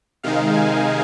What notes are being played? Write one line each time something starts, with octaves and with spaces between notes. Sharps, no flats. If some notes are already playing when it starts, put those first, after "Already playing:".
C3 D#3 G#3 D#4 F5
G#5